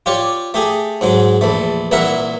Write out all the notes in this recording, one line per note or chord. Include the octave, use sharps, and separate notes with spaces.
F4 G4 C#5 D5
A3 G4 G#4
G#2 F#3 G#3
A#1 E2 A3
C2 A#2 E3 A#4 E5 F#5